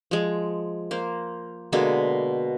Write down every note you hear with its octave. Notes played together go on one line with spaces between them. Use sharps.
F3 G#3
A#3 C5
B2 D3 G#3 A#3